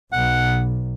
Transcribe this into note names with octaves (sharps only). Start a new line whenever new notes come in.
B1 F#5